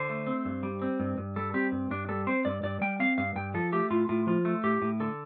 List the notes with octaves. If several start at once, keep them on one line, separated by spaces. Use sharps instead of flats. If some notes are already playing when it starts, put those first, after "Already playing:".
Already playing: D3 C5
A3
C4
G2
G3
C4
G2
G2
G3 A4
C4 G4
G2
G2 D4
G3 A4
C4 C5
G2 D5
G2 D5
G3 G5
C4 F5
G2 F5
G2 G5
F3 A4
A3 G4
A2 F4
A2 F4
F3 F4
A3
A2 G4
A2
D3 A4